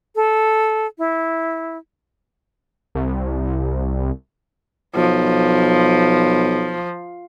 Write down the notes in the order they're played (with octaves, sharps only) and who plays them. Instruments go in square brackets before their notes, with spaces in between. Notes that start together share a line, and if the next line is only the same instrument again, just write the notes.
[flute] A4
E4
[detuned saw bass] C2
[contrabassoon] B1 [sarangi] F3